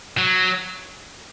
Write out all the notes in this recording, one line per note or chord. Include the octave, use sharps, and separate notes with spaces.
F#3